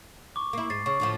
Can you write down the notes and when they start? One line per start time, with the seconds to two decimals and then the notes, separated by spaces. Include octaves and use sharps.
0.36 C#6 D6
0.53 A#3 E4
0.70 G#2 A6 C7
0.86 C#3 C#6
1.00 D2 A2 F3